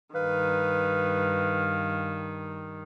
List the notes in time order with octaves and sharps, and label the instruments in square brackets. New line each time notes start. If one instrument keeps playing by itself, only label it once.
[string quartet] G2 D#3 [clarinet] B4 [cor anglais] F5